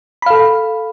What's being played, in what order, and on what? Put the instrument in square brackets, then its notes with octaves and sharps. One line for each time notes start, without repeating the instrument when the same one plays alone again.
[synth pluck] B5
F5
A4